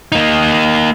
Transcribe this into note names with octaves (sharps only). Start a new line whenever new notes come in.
A#3 D#4